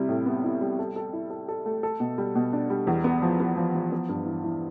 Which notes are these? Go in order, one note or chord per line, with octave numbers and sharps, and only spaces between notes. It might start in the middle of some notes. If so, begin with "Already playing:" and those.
Already playing: C3 G3 E4
A2
B3
E4
G3
A4
A4
E4
A4
A4
A3
A4
B2
G3
B2
D4
G3
E2
B3
F3
B3
F3
F3
B3
G2
E3
E3